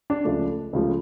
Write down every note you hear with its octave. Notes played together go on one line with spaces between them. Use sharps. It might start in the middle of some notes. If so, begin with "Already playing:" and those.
D4
C#2 C#3 F3 A3
C#2 C#3 F3 A3